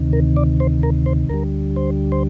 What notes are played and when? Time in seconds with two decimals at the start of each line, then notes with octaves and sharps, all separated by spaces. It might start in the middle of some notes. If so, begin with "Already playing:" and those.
Already playing: D2 C3 D#3
0.13 A#4
0.36 D5
0.60 C5
0.83 A#4
1.06 C5
1.29 D2 D3 G3 A#4
1.76 C5
2.12 C5